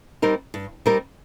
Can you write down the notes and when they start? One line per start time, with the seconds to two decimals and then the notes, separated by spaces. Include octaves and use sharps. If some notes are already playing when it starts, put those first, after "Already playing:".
0.22 G3 C4 D#4 A#4
0.54 G2
0.86 G3 C4 D#4 A#4